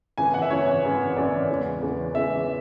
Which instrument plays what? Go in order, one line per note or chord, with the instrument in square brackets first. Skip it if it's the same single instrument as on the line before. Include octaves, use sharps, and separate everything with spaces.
[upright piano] G#1 F#2 C#3 E3 G#5
F#5
E5
G#1 F#2 C#3 E3 C#5
G#1 F#2 C#3 E3
G#1 F#2 C#3 E3 D5
E2 C#3 E3 G#3
E2 C#3 E3 G#3
E2 C#3 E3 G#3 E5